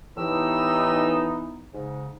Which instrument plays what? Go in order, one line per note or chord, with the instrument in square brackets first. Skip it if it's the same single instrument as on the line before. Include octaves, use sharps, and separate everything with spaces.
[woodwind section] A2 G4 E6 [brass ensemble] E3 B3 D#4
[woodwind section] G#2 C#3